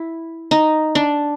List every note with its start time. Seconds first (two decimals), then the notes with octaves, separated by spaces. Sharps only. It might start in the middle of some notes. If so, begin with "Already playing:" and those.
Already playing: E4
0.51 D#4
0.95 D4